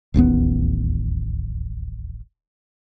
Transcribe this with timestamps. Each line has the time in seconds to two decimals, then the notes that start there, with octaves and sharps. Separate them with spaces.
0.14 D1 A1 D#2 B3